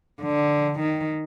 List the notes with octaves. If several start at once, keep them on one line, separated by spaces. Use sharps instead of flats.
D3
D#3